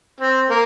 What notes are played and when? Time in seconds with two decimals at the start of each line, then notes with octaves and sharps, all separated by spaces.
0.20 C4
0.50 A#3